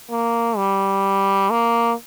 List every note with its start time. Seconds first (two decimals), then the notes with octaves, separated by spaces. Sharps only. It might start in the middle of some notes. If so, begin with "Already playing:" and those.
0.10 A#3
0.57 G3
1.50 A#3